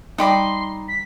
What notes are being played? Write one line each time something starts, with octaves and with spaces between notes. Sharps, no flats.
G3 D#4 D5 G5 B5 C6 D6
B6